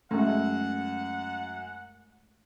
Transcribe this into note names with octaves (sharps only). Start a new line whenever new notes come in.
F#2 G#3 A3 F#5